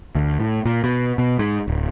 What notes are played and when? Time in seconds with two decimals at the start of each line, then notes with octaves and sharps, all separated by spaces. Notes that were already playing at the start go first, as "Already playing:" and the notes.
0.15 D2
0.40 A2
0.65 A#2
0.84 B2
1.18 B2
1.39 G#2
1.68 D1